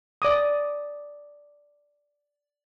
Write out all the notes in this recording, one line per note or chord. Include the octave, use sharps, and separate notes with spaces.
D5 D6 D#6